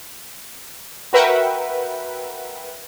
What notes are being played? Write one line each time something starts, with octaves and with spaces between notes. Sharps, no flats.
F#4 A#4 B4 E5 F#5 G5